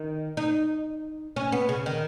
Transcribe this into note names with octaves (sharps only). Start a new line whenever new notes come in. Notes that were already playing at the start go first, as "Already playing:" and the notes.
Already playing: D#3
D#4
C#4
B3
C#3
D#3